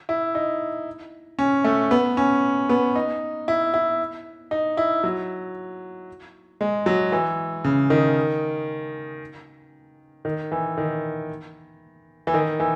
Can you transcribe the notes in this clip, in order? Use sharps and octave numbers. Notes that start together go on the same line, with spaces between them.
E4
D#4
C#4
A3
B3
C#4
B3
D#4
E4
E4
D#4
E4
F#3
G#3
F#3
E3
C#3
D#3
D#3
E3
D#3
E3
D#3
E3